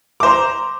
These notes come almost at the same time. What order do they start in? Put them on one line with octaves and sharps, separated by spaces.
D6 C5 A#5